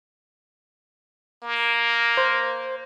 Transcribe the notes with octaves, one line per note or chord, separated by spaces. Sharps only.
A#3
C5